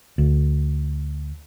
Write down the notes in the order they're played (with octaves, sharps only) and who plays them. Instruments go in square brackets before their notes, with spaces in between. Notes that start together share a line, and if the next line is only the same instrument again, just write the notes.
[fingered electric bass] D2